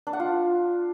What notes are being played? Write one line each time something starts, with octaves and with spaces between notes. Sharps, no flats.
D4
F#5
F4